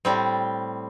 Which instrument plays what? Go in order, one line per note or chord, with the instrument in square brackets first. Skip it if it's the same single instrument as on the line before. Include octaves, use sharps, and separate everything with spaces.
[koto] A2 G3 C4